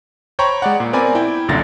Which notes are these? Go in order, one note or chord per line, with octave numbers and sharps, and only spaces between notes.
C5 C#5 G5 A#5 B5 C#6
G#3 D5 F#5
A#2
B3 C4 A#4 D5 G#5 B5
E4 G5
C2 F#2 A#2 D3 A6 A#6